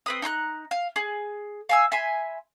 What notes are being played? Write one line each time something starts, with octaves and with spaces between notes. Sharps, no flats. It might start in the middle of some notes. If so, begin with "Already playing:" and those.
C4 B4 D#6
D#4 A#5 C6 F#6
F5
G#4
F5 G#5 E6
E5 G#5 B5 C6